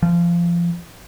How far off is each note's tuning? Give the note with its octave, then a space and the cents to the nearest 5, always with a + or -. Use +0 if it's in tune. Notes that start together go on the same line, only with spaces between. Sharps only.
F3 -25